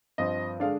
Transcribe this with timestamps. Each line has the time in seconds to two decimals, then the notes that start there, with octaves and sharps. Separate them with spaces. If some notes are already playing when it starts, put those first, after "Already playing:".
0.18 G2 F3 C4 D#5
0.60 D3 G#3 D4 F5